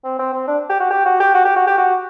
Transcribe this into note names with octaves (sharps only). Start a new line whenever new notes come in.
C4
C4
C4
D4
G4
F#4
G4
F#4
G4
F#4
G4
F#4
G4
F#4